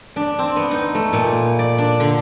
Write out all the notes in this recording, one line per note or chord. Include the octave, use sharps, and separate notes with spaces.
D4
C4
B3
D#4
A3
A#2
D5
D4
D3